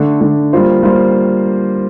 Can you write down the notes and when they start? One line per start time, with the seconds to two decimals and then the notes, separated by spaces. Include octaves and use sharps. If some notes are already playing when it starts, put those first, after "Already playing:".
Already playing: D3 A3 D4
0.20 D3 A3 D4
0.53 G3 A#3 F4 C5
0.83 G3 A#3 F4 C5